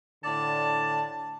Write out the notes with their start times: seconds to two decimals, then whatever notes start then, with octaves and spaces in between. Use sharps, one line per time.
0.24 A2 D3 D5 A5